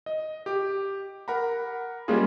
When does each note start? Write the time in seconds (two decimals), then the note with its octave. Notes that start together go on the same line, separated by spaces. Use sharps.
0.06 D#5
0.46 G4 D6
1.28 A#4 F#5 A#5 B5
2.08 G3 G#3 A#3 C#4 F4 G#4